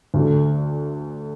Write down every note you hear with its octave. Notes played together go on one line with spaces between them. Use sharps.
D2 D3 A3